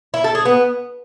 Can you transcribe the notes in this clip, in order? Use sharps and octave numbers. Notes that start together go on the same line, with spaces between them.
E4
A4
G#4
B3